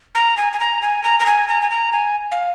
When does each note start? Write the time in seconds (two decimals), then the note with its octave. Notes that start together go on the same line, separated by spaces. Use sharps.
0.15 A#5
0.37 G#5
0.53 G#5
0.60 A#5
0.82 G#5
1.03 A#5
1.20 A#5
1.26 G#5
1.48 A#5
1.62 G#5
1.70 A#5
1.92 G#5
2.32 F5